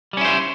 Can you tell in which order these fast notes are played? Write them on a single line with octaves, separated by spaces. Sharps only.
G3 C#4 E4 C5